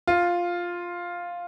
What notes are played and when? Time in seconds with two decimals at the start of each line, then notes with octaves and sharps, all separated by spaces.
0.07 F4